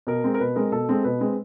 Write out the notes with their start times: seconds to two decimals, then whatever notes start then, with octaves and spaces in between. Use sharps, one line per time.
0.07 B2 A#4
0.24 G#3 C4
0.34 A#4
0.40 B2 B4
0.56 G#3 C4 A#4
0.72 B2 A4
0.89 G#3 C4
1.04 B2 B4
1.20 G#3 C4